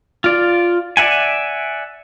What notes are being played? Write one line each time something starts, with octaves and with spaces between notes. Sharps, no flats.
F4 D5
D5 E5 F#5 G#5